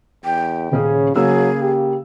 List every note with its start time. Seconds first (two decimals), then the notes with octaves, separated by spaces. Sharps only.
0.25 E2 G5
0.71 D#1 C#3 C#4 G#4
1.16 C#3 F#3 A#3 G#4 E6
1.61 G4